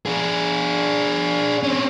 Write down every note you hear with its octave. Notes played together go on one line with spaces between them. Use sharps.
D4 G#4
C4 C#4